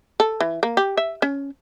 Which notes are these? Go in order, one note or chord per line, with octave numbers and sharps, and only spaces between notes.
A4
E3
A#3
G4
E5
C#4